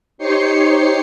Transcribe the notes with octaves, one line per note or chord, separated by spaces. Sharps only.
D#4 G4 C5 C#5 C7 C#7